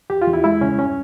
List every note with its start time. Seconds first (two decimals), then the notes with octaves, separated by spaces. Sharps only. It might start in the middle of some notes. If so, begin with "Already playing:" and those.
0.10 E2 G4
0.22 F4
0.27 E2
0.33 E4
0.44 G#3 E4
0.61 C#2 C#4
0.78 G2 C#4